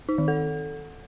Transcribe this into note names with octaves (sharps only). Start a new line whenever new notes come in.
D#4
D#3
A4